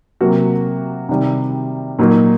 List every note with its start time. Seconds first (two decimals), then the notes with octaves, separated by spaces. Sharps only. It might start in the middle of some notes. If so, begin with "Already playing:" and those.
0.21 C3 F#3 A#3 F#4
1.09 C3 D#3 G3
1.99 A#2 F#3 A#3 D#4